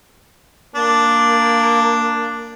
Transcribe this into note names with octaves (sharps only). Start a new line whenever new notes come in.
A#3 D4